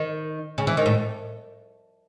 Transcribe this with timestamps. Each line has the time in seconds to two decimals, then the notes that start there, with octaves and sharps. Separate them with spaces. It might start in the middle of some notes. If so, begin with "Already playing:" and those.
Already playing: D#3
0.58 C#3
0.67 E3
0.77 D#3
0.86 A2